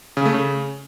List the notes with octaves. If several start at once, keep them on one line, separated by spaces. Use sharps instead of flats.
C#3
A3
C#3